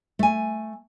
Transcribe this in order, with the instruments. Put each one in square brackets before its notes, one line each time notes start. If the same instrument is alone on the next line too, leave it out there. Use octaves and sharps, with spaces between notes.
[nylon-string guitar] A3 G#5